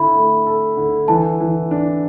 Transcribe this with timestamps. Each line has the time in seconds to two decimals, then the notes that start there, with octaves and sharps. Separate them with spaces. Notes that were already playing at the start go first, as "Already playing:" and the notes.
Already playing: D3 E4 B5
0.15 A3
0.46 A4
0.77 D3
1.08 E3 A5
1.40 E3
1.71 D4